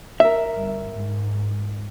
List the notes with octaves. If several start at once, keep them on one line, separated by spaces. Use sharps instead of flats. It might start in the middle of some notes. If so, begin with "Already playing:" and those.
A#4 E5
G1
G#2